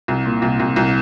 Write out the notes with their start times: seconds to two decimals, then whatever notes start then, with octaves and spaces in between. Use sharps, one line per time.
0.08 C2
0.25 A#2
0.42 C2
0.60 C2
0.76 C2